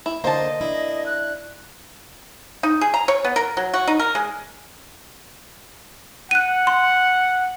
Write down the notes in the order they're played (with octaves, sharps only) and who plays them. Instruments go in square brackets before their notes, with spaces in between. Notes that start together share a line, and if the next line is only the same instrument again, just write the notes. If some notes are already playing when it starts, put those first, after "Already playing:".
[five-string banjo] E4
[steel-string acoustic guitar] D3 F#3 C5 [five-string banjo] A#3 A5 [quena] D#5
[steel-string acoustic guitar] D4 E4
[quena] F#6
[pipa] D#4
G#4
A#5
C#5
B3
A#4
F#3
F#4
D#4
A#4
G#3
[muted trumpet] F#5 [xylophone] F#6 D#7
[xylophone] C6